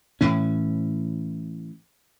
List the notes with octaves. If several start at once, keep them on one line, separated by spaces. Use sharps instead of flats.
A2 E3 C#4